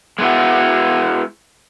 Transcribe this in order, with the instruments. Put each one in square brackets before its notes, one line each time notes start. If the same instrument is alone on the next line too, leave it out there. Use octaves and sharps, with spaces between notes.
[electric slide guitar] G#3 B3 E4 F#4